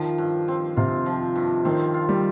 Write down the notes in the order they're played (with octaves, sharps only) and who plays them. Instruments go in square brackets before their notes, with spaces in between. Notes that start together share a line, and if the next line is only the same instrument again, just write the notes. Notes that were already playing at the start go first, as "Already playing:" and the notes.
Already playing: [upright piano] D#3 [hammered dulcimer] F3
[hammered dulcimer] G2
C4
[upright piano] C3 [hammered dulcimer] F4
[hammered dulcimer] F3
G2
[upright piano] D#3 [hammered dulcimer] C4
[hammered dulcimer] F4
[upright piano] G3